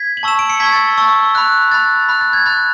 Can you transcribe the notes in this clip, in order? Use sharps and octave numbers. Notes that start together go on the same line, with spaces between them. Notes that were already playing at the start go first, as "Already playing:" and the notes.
Already playing: G#6 B6
F#7
A5 C#6 E6 E7
D7
C#7
A5 C#6 E6 G#6 B6
A6
A5 C#6 E6
B5 F#6
B5 F#6 A6
B5 F#6
A6
G#6
B5 F#6 A6